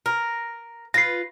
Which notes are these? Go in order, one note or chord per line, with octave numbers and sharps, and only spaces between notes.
A#4
F4 B4 A#6 C7